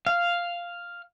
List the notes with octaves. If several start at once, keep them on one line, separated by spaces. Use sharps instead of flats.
F5